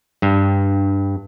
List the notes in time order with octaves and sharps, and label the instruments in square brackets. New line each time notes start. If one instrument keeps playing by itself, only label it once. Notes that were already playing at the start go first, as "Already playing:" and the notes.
[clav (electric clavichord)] G2